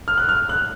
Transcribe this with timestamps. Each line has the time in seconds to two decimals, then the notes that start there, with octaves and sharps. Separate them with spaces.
0.08 F6
0.18 F#6
0.29 F6
0.49 F#6